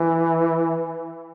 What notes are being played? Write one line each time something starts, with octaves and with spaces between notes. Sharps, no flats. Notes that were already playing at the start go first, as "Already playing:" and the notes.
Already playing: E3